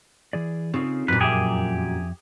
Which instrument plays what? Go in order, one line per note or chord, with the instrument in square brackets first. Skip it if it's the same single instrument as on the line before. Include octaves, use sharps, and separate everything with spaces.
[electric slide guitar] E3 G#4 D5
[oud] C#3 [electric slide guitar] C4 D#4 F4
[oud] F#2 A#2 [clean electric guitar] B4
[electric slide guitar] F2 E5 [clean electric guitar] G4 G#4